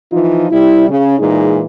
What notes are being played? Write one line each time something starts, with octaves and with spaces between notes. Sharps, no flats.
E3 F3 D#4 F4
C3 G3 E4
C#3
A#2 E3 G#3 D#4 G#4